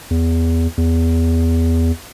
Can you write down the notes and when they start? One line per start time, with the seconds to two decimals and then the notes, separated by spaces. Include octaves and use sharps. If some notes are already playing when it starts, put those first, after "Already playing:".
0.11 E2
0.77 E2